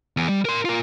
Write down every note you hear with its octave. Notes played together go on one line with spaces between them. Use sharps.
E2
G3
A#4 C6
F4 A#4